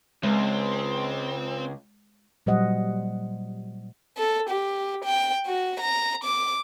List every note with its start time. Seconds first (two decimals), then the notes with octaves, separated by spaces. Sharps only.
0.23 C#2 G#3 C4
2.46 A#2 F#3 G3 C5 D#5 F#5
4.17 A4
4.49 G4
5.04 G5
5.46 F#4
5.80 A#5
6.24 D6